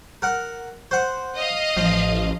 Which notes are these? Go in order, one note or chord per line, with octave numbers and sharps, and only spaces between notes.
A#4 F#5
C5 F#5
D#5 F5
A1 F3